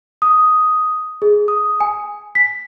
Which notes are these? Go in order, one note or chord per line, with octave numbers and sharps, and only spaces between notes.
D#6
G#4
D#6
G#5
B6